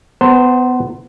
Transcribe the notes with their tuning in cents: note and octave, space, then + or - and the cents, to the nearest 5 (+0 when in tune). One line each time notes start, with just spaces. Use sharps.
B3 +20 C5 +0 A#5 -45